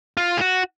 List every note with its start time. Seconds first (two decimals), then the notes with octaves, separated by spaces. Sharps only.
0.17 F4
0.37 G#4
0.41 F#4